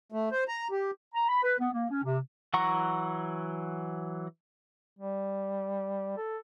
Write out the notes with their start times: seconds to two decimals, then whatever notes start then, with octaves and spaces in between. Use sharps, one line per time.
0.12 A3
0.31 C5
0.48 A#5
0.71 G4
1.14 A#5
1.28 B5
1.43 B4
1.58 B3
1.72 A#3
1.90 C#4
2.03 C3
2.54 E3 F#3 F#5 A#5 C#6
4.99 G3
6.17 A4